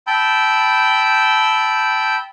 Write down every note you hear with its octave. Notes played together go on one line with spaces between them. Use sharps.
G5 A5 B5 E6 G6